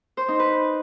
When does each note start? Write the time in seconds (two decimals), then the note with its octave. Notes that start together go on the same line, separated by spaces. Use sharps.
0.17 C5
0.28 D#4
0.39 B4